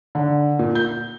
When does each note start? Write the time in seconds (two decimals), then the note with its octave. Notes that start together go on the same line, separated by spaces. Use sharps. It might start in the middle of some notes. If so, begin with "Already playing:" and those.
0.15 D3
0.59 A#2
0.75 G6